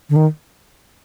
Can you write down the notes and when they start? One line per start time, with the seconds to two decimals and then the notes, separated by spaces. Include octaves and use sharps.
0.09 D3
0.16 D#3